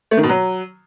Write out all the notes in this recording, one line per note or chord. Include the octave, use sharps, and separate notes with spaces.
A3
D#3
B2
F#3